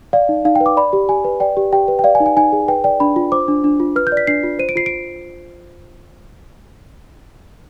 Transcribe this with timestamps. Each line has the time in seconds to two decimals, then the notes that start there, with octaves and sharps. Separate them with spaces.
0.13 D5 F5
0.29 D#4
0.45 D#4 F5
0.56 B4 G5
0.66 D6
0.77 D5 B5
0.93 G4
1.09 G4 G#5
1.25 B4
1.40 D5 G5
1.57 G4
1.73 G4 G5
1.88 B4
1.99 G5
2.04 D5 F5
2.15 G#5
2.20 D#4
2.26 G#5
2.37 D#4 G#5
2.52 G#4
2.68 B4 G5
2.84 D5 G5
3.00 D4 B5
3.16 F4
3.32 C5 D6
3.48 D4
3.64 D4
3.80 F4
3.96 B4 F6
4.07 G6
4.12 D5
4.17 B6
4.27 D4 C7
4.43 F4
4.59 C5 D#7
4.69 D7
4.76 F4 C7
4.86 D7